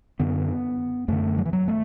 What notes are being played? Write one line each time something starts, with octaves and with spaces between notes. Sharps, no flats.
F#2 D3 B3
F#2 D3 A3
F#3
E3
F#3
A3